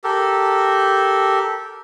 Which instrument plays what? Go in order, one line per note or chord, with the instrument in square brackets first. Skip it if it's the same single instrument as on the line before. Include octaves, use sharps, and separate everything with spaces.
[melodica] G4 A4 A#4